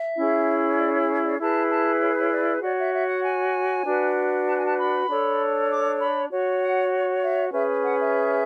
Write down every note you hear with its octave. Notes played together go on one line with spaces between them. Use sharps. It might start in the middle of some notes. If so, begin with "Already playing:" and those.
Already playing: E5
C#4 E4 G#4
D5
C#5
D5
E4 G#4 B4 A5
A5
C#5
C#5
D5
F#4 C#5 D5
E5
E5
F#5
G#5
D4 F#4 B4
A5
G#5
A5
B5
D4 A4 C#5
D6
B5
F#4 C#5
F#5
E5
C#4 G#4 B4 E5
F#5
E5